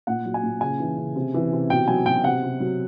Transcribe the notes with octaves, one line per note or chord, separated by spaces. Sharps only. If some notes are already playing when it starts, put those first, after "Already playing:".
A#2 F#5
F#3
G#5
A#2
C#3 G#5
E3
C#3
C3
E3
C3
B2 G5
F#3 G#5
B2 G5
C3 F#5
C3
F#3